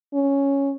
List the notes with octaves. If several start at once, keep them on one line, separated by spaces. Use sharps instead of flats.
C#4